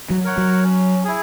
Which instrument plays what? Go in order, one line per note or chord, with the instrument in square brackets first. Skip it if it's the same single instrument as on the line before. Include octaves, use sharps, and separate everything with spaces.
[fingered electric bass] F#3
[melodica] A#4 C#5 F#5
[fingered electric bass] F#3
[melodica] C#4
E4 G#4